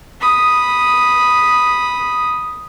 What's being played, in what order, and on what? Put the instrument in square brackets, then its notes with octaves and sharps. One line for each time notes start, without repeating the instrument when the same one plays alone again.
[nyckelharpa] B5 D#6